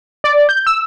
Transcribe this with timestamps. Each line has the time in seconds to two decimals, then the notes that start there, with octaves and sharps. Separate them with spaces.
0.24 D5
0.49 G6
0.67 E6